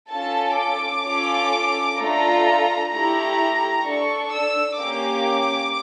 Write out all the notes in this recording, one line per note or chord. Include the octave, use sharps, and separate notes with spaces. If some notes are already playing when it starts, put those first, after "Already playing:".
C#4 F4 A4 A5
D6
C#4 F4 A4
A3 D4 F4 A4 A#5
A3 E4 G4 A#5
D4 A4 C#6
E6
A#3 C#4 G4 D6